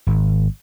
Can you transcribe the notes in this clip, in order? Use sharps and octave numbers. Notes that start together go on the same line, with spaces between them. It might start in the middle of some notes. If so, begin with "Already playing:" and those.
G#1